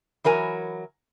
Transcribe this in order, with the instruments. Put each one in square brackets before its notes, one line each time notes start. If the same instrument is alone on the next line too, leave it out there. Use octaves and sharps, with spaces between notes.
[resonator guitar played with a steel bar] E3 F#3 A#4 G#5